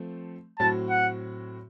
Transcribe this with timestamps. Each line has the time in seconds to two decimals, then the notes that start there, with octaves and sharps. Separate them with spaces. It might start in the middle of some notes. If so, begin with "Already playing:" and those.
Already playing: F3 A3 C4
0.59 A2 F#3 C4 F#4 A5
0.89 F#5